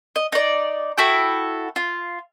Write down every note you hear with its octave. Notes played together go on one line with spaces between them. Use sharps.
D#5
D#4 D5
E4 F#4 A4 G5
F4